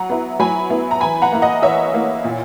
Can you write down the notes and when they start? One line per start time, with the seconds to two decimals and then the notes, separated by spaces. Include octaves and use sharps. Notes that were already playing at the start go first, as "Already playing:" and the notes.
Already playing: F#3 F#5 A#5
0.10 B3 E4
0.39 F#3 G#5 B5
0.70 B3 E4
0.91 A#5
1.01 E3 G#5 B5
1.22 F#5 A#5
1.32 A#3 E4
1.42 D#5 F#5
1.62 E3 C#5 E5
1.94 A#3 E4
2.24 A#2